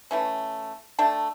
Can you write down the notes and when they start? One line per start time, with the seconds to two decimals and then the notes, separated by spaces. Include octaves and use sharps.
0.11 E3 A3 C#4
0.99 A3 D4 A4 G5